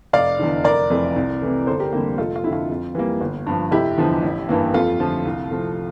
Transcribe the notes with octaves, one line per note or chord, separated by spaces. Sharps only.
F1 D5 F5
E2 D3
F1 A#4 D5
F2 E3 A3
C2
C3 E3 A3
G1 A4 C5
G4 A#4
F2 D3 G3 A#3
F1 F4 A4
F4
F2 D3 E4
F4
F2
E3 G3 A#3
G1
G2 F3
F1 E4 G4
E2 D3 F3
A1
G2 E3 A#3
F2 F4 A4
D3 F3 A3
C2
C3 F3 A3